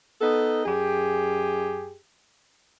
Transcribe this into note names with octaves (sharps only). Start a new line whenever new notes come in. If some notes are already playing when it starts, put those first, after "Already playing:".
B3 D#4 A4
F#2 G4 G#4